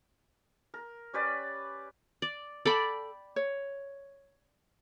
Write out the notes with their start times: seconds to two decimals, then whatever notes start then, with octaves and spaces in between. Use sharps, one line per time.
0.74 A#4
1.13 C#4 G4 B4 D5
2.22 D5
2.65 A4 D5 G5 A5 B5
3.36 C#5